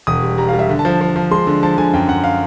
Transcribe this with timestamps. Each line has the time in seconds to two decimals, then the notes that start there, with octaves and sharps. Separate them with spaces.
0.07 E1 D#6
0.23 G3
0.38 G3 A#5
0.48 F5
0.53 G3
0.59 E5
0.69 D3
0.79 A5
0.85 F3
1.01 F3
1.16 F3
1.31 G#3 C6
1.47 D3
1.63 F3 A5
1.78 D3 G#5
1.93 F#2 G5
2.08 F#2 F#5
2.24 F5